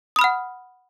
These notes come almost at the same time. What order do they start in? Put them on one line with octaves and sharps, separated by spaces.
D#6 B5 F6 F#5